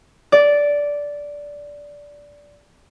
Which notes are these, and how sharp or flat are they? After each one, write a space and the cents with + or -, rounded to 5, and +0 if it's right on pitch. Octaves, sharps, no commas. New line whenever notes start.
D5 -10